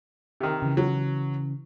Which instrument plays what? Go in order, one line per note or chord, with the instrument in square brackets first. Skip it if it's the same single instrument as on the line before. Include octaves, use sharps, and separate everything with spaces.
[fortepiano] C3 D#3
[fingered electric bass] C#3 E3
[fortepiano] F#3